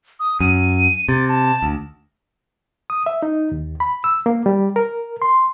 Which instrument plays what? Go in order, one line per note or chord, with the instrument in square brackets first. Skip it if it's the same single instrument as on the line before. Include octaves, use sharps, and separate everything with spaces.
[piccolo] D#6
[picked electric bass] F#2 [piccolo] D#7
[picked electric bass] C3 [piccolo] A6
[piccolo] A5
[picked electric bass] D2
[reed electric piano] D#6
E5
D#4
D#2
B5
E6
A#3
G3
A#4
C6